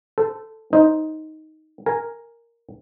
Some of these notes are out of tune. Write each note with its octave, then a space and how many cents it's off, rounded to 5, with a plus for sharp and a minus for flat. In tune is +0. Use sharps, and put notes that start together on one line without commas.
A4 +0 C5 -25
D#4 +5 C5 +0
A#4 +0 G#5 +0